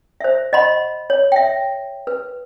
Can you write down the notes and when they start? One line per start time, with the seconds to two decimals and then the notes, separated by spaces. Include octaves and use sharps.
0.21 C5 E5
0.53 D#5 F#5 B5 C6
1.10 C#5
1.32 E5 G5
2.07 B4